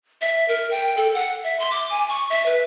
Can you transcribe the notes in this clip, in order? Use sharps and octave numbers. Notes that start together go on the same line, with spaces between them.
E5
A#4
G5
A4
F#5
E5
C6
D6
G#5
C#6
E5
B4